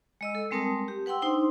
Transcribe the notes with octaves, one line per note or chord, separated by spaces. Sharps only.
G#3 D#5 E6
A4
G3 G#3 C4 A#4 A5 D#6
G4
B4 F#5 G5 C6 E6
D4 D#4 C5 C6